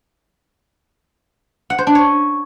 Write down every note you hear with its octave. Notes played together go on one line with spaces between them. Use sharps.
F#5
C5
D4
C#5